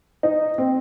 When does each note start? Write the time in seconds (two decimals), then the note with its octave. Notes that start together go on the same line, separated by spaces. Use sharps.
0.23 D#4
0.58 C4